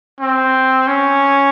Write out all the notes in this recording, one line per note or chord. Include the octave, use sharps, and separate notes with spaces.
C4
C#4